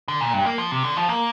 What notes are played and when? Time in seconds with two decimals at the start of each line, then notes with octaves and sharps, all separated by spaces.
0.08 D3
0.21 A#2
0.33 G2
0.46 A#3
0.58 F3
0.71 C3
0.83 D3
0.96 F3
1.09 A#3